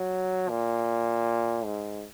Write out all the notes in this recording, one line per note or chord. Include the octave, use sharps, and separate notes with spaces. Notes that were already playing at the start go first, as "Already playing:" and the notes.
Already playing: F#3
A#2
G#2